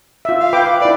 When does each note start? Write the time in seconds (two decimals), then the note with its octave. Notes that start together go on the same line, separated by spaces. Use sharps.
0.25 F4 E5
0.40 F5
0.53 B4 G5 D6
0.81 E4 B4 D5